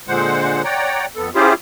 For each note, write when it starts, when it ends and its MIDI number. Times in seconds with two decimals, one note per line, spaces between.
0.08 0.62 46
0.08 0.62 50
0.08 0.62 56
0.08 0.62 72
0.08 0.62 78
0.65 1.06 73
0.65 1.06 74
0.65 1.06 78
0.65 1.06 79
0.65 1.06 82
1.16 1.30 41
1.16 1.30 59
1.16 1.30 69
1.35 1.54 61
1.35 1.54 64
1.35 1.54 65
1.35 1.54 67
1.35 1.54 68
1.35 1.54 72